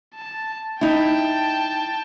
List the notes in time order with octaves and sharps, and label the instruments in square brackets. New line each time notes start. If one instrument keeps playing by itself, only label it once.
[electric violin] A5
[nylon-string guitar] D#4 E4 [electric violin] G5 A5